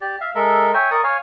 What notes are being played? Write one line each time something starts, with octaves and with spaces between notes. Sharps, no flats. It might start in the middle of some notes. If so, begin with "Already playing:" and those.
G4 D5
E5 F5
G#3 A4 A#4 E5
C#5 E5 G5 G#5
A#4 D5 C#6 D#6
C#5 F5 G#5